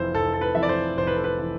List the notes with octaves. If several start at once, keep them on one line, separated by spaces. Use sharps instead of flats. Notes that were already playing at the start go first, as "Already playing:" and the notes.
Already playing: F1 F2 E3 C5
F1 A4
A4
B4
F2 E3 E5
D5
C5
F1 C5
B4
A4
B4
E3